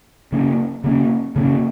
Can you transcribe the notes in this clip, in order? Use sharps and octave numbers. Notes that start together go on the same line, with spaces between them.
C#3 A#3 C#4
C#3 A#3 C#4
C#3 A#3 C#4